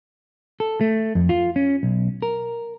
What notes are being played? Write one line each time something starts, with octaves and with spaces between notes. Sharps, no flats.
A4
A3
F2
F4
C#4
B1
A#4